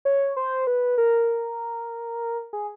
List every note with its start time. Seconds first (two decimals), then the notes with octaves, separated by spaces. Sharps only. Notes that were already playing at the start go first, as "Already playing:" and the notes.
0.05 C#5
0.37 C5
0.67 B4
0.98 A#4
2.53 G#4